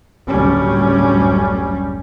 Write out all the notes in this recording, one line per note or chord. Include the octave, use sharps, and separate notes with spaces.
F#1 D2 A2 G3 C#4